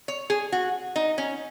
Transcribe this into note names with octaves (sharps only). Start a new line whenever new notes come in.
C#5
G#4
F#4
D#4
C#4